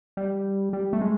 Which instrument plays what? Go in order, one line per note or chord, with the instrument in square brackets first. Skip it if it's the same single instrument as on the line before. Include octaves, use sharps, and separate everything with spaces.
[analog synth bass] G3
G3
A3
G#3